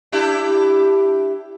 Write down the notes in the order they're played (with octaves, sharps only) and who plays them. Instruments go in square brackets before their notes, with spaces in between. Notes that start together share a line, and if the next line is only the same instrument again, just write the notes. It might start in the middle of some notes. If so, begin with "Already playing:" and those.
[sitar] D4 E4 G4